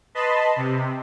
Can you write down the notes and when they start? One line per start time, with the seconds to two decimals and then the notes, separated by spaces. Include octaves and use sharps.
0.15 B4 D#5 A5 B5 C6
0.56 C3